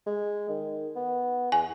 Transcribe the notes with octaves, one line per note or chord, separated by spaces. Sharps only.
G#3
D#3
B3
E2 G#5